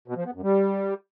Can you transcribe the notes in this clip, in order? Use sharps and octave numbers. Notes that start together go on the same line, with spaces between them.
B2
F3
B3
F#2
G3